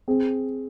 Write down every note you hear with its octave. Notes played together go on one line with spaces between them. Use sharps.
C4 G#4